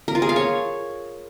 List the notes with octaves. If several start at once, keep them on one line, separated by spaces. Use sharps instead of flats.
A#4
F4
G#4
F5
C#5